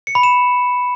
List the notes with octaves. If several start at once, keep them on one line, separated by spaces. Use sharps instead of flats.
C#7
B5
E7